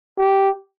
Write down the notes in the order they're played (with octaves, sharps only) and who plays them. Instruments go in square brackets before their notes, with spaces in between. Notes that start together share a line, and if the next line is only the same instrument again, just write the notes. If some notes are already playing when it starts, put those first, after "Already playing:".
[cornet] G4